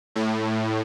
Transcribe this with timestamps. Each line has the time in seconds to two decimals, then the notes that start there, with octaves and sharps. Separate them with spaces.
0.16 A2